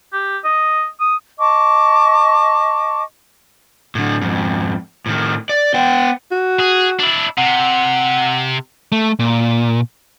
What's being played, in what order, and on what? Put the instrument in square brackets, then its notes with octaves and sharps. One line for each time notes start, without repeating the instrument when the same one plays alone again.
[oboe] G4
D#5
D#6
[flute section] D#5 A5 C#6 D6
[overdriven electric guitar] A2 D3
F2 G#2
A2 D#3
D5
B3 G5
[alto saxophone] F#4
[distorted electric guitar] G#4
D4 E4
[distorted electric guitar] C3 [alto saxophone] F#5
[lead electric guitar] A3
A#2